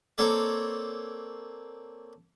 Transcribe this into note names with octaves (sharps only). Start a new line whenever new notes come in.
A#3 C4 A4 C#5 D5